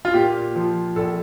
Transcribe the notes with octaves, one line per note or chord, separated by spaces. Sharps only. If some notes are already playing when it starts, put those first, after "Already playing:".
F4
A#2 G4
F3
A#1 A4